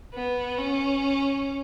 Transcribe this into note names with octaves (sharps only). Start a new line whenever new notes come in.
B3
C#4